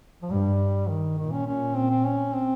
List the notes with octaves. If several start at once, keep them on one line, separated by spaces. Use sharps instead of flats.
F3
G2 G3
D#3
A#2 D#3
C#4
C#4
C4
C4
C#4
C4